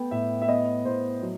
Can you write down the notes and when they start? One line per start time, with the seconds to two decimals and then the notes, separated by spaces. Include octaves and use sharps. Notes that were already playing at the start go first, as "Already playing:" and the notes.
Already playing: A3 B3 G5
0.11 A2 E5
0.42 E5
0.48 B3 D#5
0.85 A2 C5
1.22 F#3